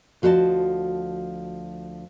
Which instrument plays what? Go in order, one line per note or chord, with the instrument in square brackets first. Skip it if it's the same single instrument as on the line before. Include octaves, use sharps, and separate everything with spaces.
[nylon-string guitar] D2 F3 F#4 C#5 D#5 A5